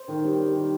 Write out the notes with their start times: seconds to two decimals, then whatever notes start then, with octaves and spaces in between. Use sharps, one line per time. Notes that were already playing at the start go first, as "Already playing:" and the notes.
Already playing: C5
0.08 D#3
0.24 G3
0.39 G3
0.55 D#3